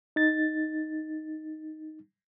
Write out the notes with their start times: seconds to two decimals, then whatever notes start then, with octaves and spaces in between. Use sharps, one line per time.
0.16 D#4 A6